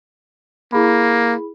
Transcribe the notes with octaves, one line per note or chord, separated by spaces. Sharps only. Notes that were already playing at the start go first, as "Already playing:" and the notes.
A#3 E4 G#4 B5